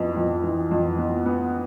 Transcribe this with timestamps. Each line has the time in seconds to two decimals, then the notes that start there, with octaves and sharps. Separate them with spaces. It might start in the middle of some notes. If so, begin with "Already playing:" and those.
Already playing: F2 E3 B3
0.16 F2
0.44 E3
0.71 F2
0.99 B3
1.26 B3